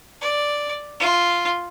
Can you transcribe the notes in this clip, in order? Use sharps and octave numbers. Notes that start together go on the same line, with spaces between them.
D5
F4